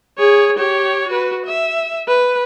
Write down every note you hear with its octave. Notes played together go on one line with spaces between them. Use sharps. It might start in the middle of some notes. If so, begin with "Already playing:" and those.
G#4 C#5
G4 C#5
F#4 B4
E5
B4